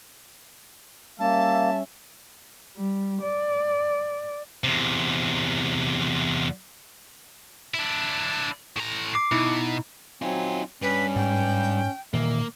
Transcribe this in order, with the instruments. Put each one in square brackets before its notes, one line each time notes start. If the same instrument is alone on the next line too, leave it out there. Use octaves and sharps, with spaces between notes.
[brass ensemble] G3 C#4 E5 [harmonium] A#3 [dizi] A5
[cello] G3
D5
[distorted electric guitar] E2 C3
D4 E4
A2 A#5
[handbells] D6 C7
[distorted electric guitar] B2 [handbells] D#4 E4
[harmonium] F#3 C4 G#5 [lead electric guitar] D#4 F4
[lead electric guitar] G2 [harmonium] C#4 [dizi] B4
[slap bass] G#2 [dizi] G5
[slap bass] A#2 D#3 E3 [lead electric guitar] A#3 [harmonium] E5